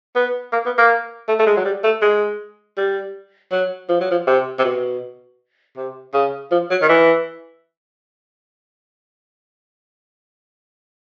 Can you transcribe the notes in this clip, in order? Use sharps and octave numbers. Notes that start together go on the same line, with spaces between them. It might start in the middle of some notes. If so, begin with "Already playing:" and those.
B3
A#3
B3
A#3
A3
A3
G#3
F#3
G3
A3
G#3
G3
F#3
F3
F#3
F3
C3
C3
B2
C3
C#3
F3
F#3
D#3
E3